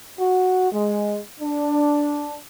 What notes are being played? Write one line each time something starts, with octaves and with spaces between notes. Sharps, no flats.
F#4
G#3
D4